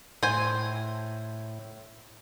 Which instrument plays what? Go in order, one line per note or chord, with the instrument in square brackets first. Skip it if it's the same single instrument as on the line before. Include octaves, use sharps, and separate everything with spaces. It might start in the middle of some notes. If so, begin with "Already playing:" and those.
[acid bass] A2 [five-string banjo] C5 G#5